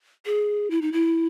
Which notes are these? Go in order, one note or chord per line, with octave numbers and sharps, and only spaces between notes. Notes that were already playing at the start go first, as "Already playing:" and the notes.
G#4
E4
D#4
E4